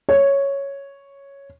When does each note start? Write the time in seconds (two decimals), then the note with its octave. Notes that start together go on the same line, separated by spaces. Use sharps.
0.09 C#5